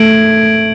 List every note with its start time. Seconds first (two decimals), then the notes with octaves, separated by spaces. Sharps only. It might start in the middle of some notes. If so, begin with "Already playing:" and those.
Already playing: A3 G#6 D7 F#7